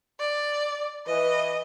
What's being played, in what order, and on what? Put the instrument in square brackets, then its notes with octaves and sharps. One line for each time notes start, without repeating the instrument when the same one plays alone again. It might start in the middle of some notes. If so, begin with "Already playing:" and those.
[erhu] D5
[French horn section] E3 B4 [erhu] D#5